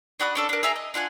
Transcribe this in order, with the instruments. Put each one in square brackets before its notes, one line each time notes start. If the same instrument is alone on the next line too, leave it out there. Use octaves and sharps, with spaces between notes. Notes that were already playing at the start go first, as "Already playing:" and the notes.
[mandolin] D4 F#4 B5 D#6
C#4 D4 A4
D4 A#4
G#4 E5 G#5 A#5
D#5
D4 F4 F#5 G#5